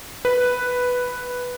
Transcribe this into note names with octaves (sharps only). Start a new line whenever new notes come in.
B4